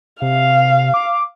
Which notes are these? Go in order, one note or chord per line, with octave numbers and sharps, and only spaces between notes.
C3 F5
D6